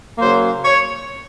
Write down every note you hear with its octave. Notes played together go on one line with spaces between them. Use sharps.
C#3 F#3 A#3 C5
C#5